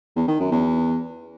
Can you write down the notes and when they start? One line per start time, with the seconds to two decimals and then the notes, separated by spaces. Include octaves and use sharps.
0.16 E2
0.28 D#3
0.40 F#2
0.51 E2